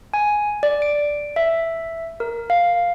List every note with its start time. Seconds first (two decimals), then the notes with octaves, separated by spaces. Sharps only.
0.14 G#5
0.63 D5
0.82 D7
1.36 E5
2.20 A#4
2.50 F5